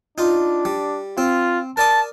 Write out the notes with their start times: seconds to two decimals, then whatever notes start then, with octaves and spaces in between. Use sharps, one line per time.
0.18 D4 D#4 F4
0.65 G3
1.18 C4 F4
1.77 A#4 D5 A5 D#6